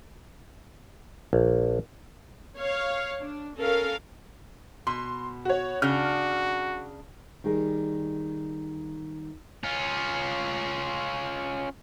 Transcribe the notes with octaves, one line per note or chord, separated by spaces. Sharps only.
A#1
C#5 F5
D4
C#4 A4 A#4 F5
B2 C6
F#4 C#5
C#3 D4 F#4 F6
D#3 G3 D#4 G#4
C#4 F4